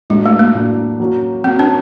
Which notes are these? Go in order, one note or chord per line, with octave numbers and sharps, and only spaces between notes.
A2 F#3 G#3 A#3 D4
A3
A#3
A2 F#3 A#3 D4
F#3 A#3 C#4
F#3 A#3 C4 C#4
D4